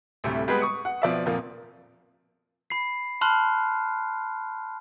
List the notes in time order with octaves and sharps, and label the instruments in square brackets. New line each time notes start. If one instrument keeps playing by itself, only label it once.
[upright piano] D2 A2 C3 G3 A3
G3 G#3 B3 G#4 B4
C#6 D#6 C#7
F#5
B2 F3 D5 E5
F2 A#2 F3 A#3
[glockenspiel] B5 C7
A5 B5 C6 F6 F#6